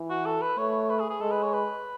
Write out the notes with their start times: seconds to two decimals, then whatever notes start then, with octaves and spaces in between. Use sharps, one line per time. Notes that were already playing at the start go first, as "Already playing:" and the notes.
Already playing: E3
0.10 F#4
0.26 A4
0.42 B4
0.58 A3 C#5
0.90 B4
1.00 G#4
1.10 G#4
1.21 G#3 A4
1.31 B4
1.43 C#5
1.53 B4